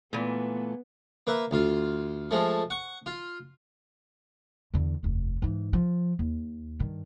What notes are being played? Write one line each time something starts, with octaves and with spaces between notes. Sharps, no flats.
A#2 E3 A3 B3
A#3 B4 E5
D2 F4
F3 G#3 A3
F#5 C#6
F4
E2 D3
F1 D#2
G#2 E3
F3
D#2
G2 D#3